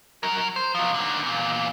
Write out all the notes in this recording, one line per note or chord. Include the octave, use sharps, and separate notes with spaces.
F#3 A#4
C5
F3 F#3
D3 D#3
E2 A#2